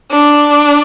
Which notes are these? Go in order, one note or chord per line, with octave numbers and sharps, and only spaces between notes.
D4